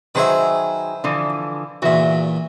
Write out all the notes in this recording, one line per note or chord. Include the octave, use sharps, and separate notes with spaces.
D#3 F#3 G#4 B4 C5 E5
D3 E3 F3
E2 A#2 F#4 E5